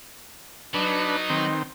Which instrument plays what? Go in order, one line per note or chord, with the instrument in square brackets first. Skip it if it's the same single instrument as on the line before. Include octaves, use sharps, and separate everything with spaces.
[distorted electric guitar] F#3 [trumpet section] B3 D#4 [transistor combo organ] D4 B4
[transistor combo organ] D#3 C4